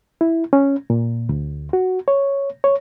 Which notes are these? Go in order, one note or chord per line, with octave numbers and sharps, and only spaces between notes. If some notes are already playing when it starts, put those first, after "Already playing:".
E4
C#4
A#2
D2
F#4
C#5
C#5